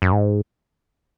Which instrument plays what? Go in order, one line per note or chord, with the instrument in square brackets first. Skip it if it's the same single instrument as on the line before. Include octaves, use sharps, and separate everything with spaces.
[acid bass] F#2
G#2